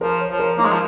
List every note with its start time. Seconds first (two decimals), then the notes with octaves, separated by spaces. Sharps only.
0.01 F3 A#4
0.20 C#5
0.30 F3 C#5
0.39 A#4
0.58 A#3 D#4
0.65 G#3
0.72 F3